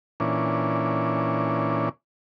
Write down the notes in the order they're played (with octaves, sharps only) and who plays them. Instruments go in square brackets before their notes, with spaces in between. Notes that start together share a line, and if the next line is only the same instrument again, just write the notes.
[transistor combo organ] A#2 E3 C#4 D4